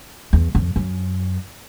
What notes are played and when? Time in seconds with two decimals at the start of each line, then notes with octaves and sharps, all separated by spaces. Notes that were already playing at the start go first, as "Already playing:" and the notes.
0.33 E2
0.55 F2
0.76 F#2